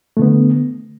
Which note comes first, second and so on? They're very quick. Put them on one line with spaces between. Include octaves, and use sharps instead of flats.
A3 D3 B3